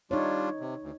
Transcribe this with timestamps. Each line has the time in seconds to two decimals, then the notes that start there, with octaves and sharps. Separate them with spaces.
0.11 G3 D4 D#4 F4 C#5
0.61 C3
0.83 D2